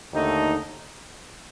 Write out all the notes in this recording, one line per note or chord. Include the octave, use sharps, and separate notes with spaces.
D#2 D3 A3 D#4